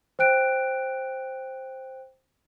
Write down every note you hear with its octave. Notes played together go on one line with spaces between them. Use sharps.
C5 G5 F#6 D7